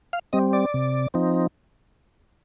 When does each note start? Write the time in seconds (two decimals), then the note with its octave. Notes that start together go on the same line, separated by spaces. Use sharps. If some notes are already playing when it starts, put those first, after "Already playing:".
0.13 F5
0.33 G3 C4 D#5
0.53 D5
0.74 C3
1.14 F3 C4 D#4